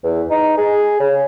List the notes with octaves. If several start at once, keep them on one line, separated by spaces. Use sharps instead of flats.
E2
D#4
G#4
C#3